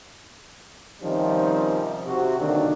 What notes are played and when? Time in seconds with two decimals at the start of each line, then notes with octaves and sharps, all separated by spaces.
1.02 C3 D#3 F3 G3 C#4 D#4
2.07 C3 F#4
2.39 B1 D3 D#3 F#3 A#3 D4